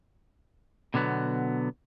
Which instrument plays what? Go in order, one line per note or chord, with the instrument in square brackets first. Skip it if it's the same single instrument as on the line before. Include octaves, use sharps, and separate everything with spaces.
[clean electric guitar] B2 D3 F#3 B3